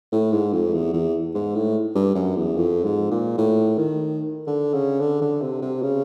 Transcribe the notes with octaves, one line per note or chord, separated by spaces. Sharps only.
A2
G#2
F2
E2
E2
G#2
A2
G2
F#2
E2
F2
G#2
A#2
A2
D#3
D3
C#3
D3
D3
C3
C3
C#3